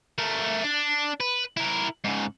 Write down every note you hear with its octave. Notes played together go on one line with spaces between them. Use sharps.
A3 A#4
D4
B4
E4 A#4
G#2 C#3